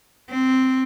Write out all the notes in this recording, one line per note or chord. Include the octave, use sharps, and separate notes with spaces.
C4